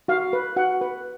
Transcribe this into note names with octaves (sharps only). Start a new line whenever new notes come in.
F#4 F5
B4
F#4 F#5
B4